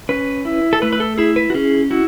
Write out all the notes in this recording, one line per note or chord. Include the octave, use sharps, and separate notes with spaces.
C#4 B4
E4
A4
A3 B4
B4
A4
E4 G#4
B4
F#4
C#4 G#4
E4 F#4